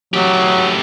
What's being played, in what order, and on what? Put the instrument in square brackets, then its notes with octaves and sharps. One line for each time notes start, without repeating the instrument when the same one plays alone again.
[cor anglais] F#3 [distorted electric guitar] A3 G4